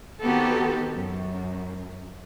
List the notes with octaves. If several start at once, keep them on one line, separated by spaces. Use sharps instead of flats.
D#3 B3 C4 F#4 G4 A4
F#2